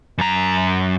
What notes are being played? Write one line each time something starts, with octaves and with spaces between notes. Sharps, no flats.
F#2 A#5